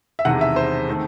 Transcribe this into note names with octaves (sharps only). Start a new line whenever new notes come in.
E5
E1 E2 C3 D#3 F#5
E5
C5
D#3 A3 C4